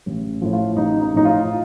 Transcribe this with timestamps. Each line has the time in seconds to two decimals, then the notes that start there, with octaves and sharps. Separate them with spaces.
0.06 A1
0.42 A2 F3
0.53 F4
0.77 A1 D#4
1.01 D#4
1.13 A2 F3 D#4
1.25 F4